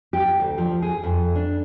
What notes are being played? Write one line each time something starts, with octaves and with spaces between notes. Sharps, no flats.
G4
D2
F3
G#4
F2
D4